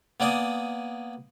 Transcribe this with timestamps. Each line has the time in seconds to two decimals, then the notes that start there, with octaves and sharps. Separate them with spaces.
0.20 A#3 B3 D5 G#5 D#6